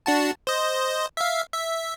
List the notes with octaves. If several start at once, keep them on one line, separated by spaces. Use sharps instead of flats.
D4 F#4 A5
C5 D#5
E5 F5
E5